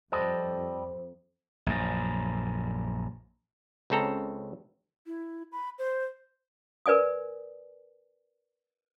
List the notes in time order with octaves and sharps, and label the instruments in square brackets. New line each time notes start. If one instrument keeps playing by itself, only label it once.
[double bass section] F2 [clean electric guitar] G3 A4 D#5 [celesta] C5
[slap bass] A#1 F#2
[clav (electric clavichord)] C#2 C#3 C4 A4 A#5
[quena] E4
B5
C5
[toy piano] A#4 B4 D5 G#5 D#6